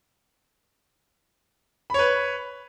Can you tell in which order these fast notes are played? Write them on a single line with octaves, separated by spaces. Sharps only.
B5 C#5 B4